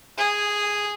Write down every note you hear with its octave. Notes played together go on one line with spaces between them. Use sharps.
G#4